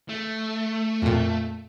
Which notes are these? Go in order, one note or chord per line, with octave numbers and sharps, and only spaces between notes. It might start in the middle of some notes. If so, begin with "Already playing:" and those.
A3
F2 A#2